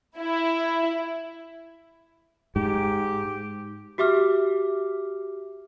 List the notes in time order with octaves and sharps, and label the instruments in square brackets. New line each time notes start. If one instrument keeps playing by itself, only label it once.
[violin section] E4
[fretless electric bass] G#2 [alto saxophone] G4
[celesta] F#4 G4 E5 D6 F6